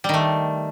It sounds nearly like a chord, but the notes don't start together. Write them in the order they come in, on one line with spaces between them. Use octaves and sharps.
G3 D#3 A3